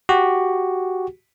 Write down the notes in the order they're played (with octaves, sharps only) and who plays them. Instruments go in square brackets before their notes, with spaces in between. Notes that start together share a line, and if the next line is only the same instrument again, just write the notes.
[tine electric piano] F#4 G4